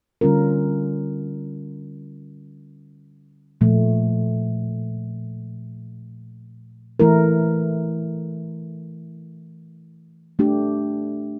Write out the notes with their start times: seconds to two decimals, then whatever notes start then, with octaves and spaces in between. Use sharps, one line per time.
0.21 D3 G3 C#4 F4 A#4
3.61 A#2 F3 A3
7.00 E3 A3 E4 A#4
10.39 A3 D4 G4